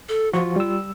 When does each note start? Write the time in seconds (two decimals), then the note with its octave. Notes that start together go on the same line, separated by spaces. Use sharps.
0.09 A4
0.33 F3 F4 F#4 C#6
0.56 G3 E6